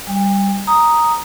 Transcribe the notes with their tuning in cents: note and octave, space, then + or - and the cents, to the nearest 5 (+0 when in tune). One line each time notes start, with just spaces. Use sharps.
G3 +0 G5 +45
A#5 +0 D#6 +0